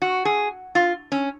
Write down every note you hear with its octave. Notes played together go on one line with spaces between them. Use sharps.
F#4
G#4
F4
C#4